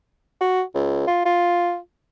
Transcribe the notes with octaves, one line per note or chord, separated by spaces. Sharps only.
F#4
C#2
F4
F4